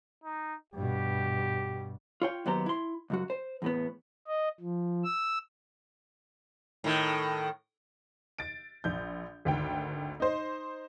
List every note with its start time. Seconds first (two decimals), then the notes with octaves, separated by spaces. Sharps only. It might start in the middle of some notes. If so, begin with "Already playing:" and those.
0.24 D#4
0.74 G2 B2 G4
2.22 F4 C#5 G5
2.46 D#2 F#3 B3 G4 C5 A#5
2.66 E4 C6
3.10 C#2 F#2 F#4
3.30 C5
3.62 E2 A2 B3
4.27 D#5
4.60 F3
5.04 E6
6.84 A2 D#3
8.38 A6 D7
8.84 A#1 G6
9.45 G#1 D2 G5
10.20 D#4 C5